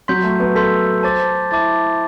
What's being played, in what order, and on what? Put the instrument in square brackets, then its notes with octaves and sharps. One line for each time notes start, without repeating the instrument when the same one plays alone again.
[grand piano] F#3 [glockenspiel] C6 G6 B6
[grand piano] A3
B3
[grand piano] A4 [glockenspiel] C6 G6 B6
[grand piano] C5 [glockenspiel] A5 D6 A6
[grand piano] E4 [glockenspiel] A5 D6 A6